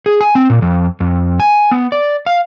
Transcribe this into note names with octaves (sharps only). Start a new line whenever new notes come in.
G#4
G#5
C4
A#2
F2
F2
G#5
B3
D5
F5